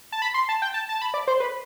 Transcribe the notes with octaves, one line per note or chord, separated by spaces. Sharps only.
A5
B5
C6
A5
G5
A5
A5
B5
D5
C5
B4